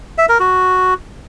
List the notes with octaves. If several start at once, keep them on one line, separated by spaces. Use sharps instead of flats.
E5
A#4
F#4